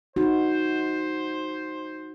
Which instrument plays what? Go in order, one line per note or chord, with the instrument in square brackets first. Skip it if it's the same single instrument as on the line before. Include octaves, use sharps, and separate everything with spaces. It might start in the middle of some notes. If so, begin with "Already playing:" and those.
[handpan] D#4 F#4 [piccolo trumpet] C5